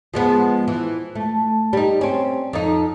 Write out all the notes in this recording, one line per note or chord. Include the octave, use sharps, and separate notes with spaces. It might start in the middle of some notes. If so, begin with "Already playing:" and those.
F3 G#3 B3
E3
A3
G3 D#4
C4 C#4
F2 D#4